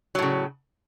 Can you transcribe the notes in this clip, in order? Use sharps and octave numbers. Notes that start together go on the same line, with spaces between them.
A2 C#3 F#3